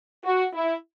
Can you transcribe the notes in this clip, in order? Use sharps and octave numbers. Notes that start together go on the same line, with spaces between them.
F#4
E4